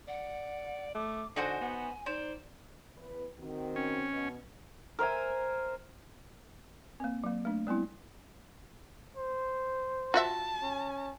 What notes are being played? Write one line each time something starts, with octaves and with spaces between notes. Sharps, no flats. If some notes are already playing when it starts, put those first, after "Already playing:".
D5 F#5
A3 D6
D3 D#4 F#4 C5 G#5
B3
D#4 C5 D5
E2 B4
D#3 C4 F#4
C#4
B2
A#4 C5 E5 G#5
A#3 C4
F#3 A#3
A3 D4
G3 B3 C4 E4
C5
F4 F#4 E5 A5
C#4